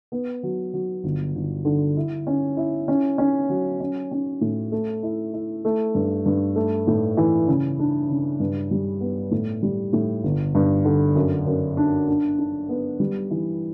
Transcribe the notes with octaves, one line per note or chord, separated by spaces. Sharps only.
B3
F#3
F#3
G1
G1
D3
E4
C#4
E4
C#4
C#4
F#3
C#4
C#4
A2
A3
E4
E4
A3
G2
G2
A3
A2
E3
C#3
D4
C#3
G2
G3
B3
A2
G3
A2
G1
G2
D3
F#2
F#2
D4
D4
D4
B3
G3
E3